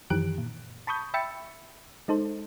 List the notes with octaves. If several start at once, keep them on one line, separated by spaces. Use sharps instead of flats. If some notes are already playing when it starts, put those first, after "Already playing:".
F#2 D#3 E3 G4 F#6 D7
A#2
A5 B5 C#6 D#6 G6
E5 G5 B5 E6 A6 C#7
G#3 D#4 A4 C5